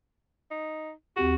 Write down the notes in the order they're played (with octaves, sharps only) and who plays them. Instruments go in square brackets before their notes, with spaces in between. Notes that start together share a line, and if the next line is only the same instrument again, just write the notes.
[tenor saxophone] D#4
[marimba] D#2 C4 G4 [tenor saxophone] F#4